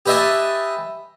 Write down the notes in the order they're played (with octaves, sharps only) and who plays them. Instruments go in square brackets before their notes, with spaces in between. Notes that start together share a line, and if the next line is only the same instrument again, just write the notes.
[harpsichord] G4 B4 D#5 E5 G#5 A5